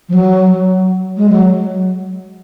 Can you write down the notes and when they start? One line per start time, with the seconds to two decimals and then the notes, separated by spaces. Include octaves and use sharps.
0.09 F3
0.14 F#3
1.17 G#3
1.29 F#3